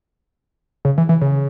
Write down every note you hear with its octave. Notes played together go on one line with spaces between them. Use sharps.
C#3
E3
E3
C#3